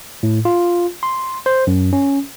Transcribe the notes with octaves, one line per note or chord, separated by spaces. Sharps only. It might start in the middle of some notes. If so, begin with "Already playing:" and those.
A2
F4
C6
C5
F#2
C#4